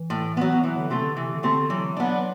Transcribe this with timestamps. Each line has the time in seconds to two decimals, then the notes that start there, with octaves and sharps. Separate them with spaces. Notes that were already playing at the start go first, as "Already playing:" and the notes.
Already playing: E3
0.10 A2
0.37 F#3 B3
0.63 E3 F#3
0.77 D3
0.90 C3 A3 C4 G4
1.04 D3
1.16 C3 E3
1.35 D3
1.43 A3 C4 G4
1.53 D3
1.70 E3 F#3
1.97 B3 D4